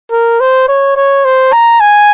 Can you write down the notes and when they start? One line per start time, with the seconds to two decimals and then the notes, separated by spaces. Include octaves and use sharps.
0.12 A#4
0.40 C5
0.68 C#5
0.96 C#5
1.25 C5
1.53 A#5
1.80 G#5